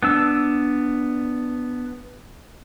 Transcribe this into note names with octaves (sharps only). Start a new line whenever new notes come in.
B3 D4 E6